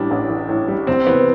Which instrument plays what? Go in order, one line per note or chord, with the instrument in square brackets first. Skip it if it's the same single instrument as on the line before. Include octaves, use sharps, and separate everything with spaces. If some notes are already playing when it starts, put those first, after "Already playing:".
Already playing: [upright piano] A1 A2 E3 G3 [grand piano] D4
[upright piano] A1
E3
A2
G3
[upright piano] C2 [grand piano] C4
[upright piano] E3 [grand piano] B3